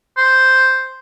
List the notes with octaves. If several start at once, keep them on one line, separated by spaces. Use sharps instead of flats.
C5